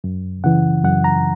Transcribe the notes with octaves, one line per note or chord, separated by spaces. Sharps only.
F#2
C#3 E3 F#5
F#2 F#5
A#5